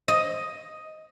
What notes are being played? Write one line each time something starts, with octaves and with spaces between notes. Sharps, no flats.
D#5